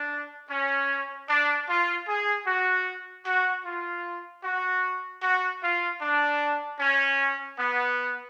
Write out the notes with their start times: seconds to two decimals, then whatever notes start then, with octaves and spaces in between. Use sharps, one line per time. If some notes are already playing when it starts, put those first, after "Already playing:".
Already playing: D4
0.50 C#4
1.29 D4
1.69 F4
2.08 G#4
2.47 F#4
3.26 F#4
3.65 F4
4.44 F#4
5.23 F#4
5.63 F4
6.02 D4
6.80 C#4
7.59 B3